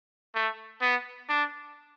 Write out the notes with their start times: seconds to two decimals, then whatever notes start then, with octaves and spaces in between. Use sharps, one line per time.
0.35 A3
0.81 B3
1.29 D4